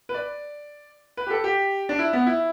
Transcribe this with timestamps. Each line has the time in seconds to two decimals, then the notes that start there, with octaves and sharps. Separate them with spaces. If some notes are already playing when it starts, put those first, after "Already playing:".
0.09 B4
0.14 D5
1.17 B4
1.27 G4
1.31 A4
1.44 G4
1.89 D4
1.99 E4
2.13 B3
2.27 E4